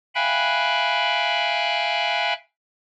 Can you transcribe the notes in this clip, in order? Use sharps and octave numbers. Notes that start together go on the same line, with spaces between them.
E5 F5 G5 G#5 B5 F#6